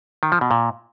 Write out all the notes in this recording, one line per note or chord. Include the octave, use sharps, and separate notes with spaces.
D#3
F3
B2
A#2